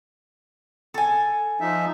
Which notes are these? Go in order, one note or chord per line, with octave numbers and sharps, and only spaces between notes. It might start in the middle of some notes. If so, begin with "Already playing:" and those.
A4 G#5
F3 D#4 E5